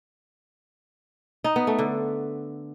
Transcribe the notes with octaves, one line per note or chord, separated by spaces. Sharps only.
D#4
B3
A3
D3